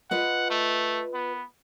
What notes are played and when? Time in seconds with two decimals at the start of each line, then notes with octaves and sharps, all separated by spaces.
0.11 F4 B4 D#5 F#5
0.50 A3
1.14 B3